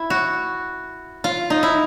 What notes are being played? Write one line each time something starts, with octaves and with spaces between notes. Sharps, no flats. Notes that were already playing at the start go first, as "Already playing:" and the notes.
Already playing: E4
F#4
F4
D#4
E4